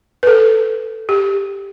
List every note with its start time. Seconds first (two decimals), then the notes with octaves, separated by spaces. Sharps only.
0.23 B4
0.27 A4
1.09 G4